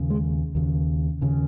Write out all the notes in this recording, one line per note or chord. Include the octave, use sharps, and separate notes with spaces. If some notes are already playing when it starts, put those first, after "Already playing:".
Already playing: D#2 C#3
G#3
D#2 C#3
D#2 C#3